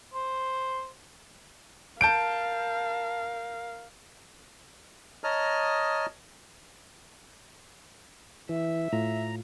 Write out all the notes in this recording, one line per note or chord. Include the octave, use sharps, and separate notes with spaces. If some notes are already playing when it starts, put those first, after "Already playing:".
C5
A#4 F5 A5 G6 D7
C#5 D#5 A5 A#5 D#6 F6
E3 E5
A2 F4 A#5